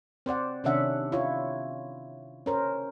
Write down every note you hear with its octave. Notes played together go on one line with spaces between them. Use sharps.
C4 C5 D5 F#5
C3 D#3 C#4 D4 E5 F#5
E4 F4 C#5
C#4 A#4 C5